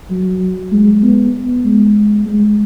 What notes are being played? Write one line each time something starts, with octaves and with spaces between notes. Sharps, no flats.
F#3
G#3
B3
G#3
G#3